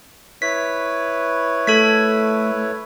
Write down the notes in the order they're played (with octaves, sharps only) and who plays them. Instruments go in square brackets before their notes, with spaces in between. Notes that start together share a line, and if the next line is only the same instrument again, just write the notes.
[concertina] E4 B4 C#5 [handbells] B6
[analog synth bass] A3 [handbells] A4 G#6 B6